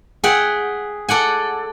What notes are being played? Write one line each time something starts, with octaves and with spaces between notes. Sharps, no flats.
G#4 E5 F#5 G5
A4 D5 F#5 G#5